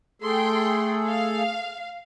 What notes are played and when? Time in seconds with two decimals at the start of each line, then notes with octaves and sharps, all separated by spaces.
0.22 A3 G#4 A4 G5 C6
1.07 F5